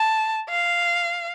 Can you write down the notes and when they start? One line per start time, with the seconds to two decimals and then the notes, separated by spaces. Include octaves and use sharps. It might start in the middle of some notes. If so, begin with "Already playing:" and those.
Already playing: A5
0.49 F5